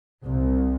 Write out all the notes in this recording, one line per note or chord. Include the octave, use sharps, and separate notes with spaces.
C2